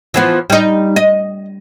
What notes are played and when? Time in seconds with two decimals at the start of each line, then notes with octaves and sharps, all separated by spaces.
0.14 E3 F3 B3
0.50 G3 D#4
0.96 D#5